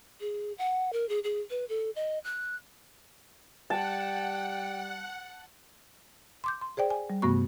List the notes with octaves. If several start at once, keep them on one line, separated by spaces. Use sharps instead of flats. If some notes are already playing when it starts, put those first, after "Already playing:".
G#4
F#5
A#4
G#4
G#4
B4
A4
D#5
F#6
G3 F#5 G5 A5
C6 D6 G6
C6
G#4 C5 D5 G5
G#5
G3
G2 C3 A3 B3 F#4 C#6